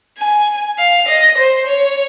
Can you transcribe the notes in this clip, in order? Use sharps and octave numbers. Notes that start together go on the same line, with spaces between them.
G#5
F5
D#5
C5
C#5